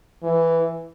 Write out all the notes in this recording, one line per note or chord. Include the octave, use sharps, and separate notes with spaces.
E3